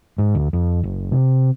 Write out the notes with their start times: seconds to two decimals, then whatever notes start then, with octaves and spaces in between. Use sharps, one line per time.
0.18 G#2
0.35 D2
0.53 F2
0.84 F#1
1.12 C3